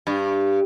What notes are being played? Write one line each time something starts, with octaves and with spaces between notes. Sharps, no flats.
G2